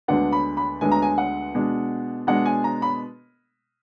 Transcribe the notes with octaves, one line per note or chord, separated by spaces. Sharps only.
D2 D3 G#3 B3 D4 F#5
B5
B5
D2 D3 G#3 B3 D4 G#5
A#5
G#5
F#5
B2 G#3 D4
B2 G#3 D4 F#5
G#5
A#5
B5